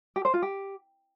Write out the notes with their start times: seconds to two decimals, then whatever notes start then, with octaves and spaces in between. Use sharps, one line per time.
0.16 G4
0.25 C5
0.34 F4
0.42 G4